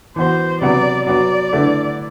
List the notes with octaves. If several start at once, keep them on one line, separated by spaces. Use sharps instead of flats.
E3 B3 F#4 C5
C3 F#3 B3 D5
F#3 B3 F#4 D5
D3 A3 E4 B4